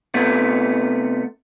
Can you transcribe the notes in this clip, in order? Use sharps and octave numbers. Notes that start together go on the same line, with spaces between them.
C3 A3 B3